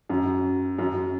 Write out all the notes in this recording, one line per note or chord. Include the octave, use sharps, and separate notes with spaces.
F#2
F#2